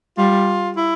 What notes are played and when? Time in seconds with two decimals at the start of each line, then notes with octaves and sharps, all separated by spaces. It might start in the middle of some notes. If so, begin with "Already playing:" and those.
0.18 G3 F4
0.76 E4